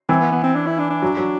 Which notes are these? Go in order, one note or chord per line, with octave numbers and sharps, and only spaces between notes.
E3 C4
B3
B3
C4
D4
E4
D4
D4
F#3
F#3